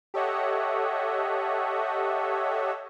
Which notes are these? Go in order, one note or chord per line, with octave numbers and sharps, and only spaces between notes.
G4 A4 C#5 D#5 E5 F#5